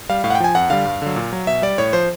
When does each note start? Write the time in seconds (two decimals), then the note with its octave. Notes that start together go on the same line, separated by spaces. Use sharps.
0.09 G3 F5
0.24 A2 F5
0.30 F#5
0.35 G5
0.40 F3 G#5
0.55 F2 F#5
0.70 D3 G3 F5
0.85 G2
1.02 D3 F#3
1.16 A#2
1.33 F#3
1.47 B2 E5
1.62 G3 D5
1.78 A2 C#5
1.93 F3 C5